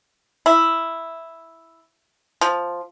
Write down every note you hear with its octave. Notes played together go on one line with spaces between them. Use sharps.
E4
F3